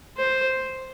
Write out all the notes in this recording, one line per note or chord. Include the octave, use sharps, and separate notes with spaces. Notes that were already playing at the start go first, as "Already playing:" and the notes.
C5